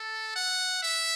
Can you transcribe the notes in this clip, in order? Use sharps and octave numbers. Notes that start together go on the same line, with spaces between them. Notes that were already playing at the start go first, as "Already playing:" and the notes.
Already playing: A4
F#5
E5